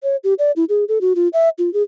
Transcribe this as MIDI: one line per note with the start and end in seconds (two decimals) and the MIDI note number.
0.03 0.16 73
0.24 0.34 67
0.39 0.52 74
0.56 0.65 64
0.69 0.84 68
0.89 0.99 69
1.01 1.13 66
1.16 1.28 65
1.33 1.49 76
1.58 1.72 65
1.74 1.83 68